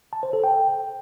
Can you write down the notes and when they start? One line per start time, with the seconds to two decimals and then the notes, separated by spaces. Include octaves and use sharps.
0.13 A5
0.23 C5
0.33 A4
0.44 G5